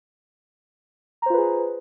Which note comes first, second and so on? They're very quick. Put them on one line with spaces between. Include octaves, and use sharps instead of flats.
A#5 C5 F4 B4 G#4